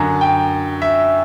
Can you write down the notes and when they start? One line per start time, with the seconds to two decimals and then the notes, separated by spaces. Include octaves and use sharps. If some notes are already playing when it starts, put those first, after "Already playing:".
Already playing: F#2 D3 A#5
0.21 G5
0.82 E5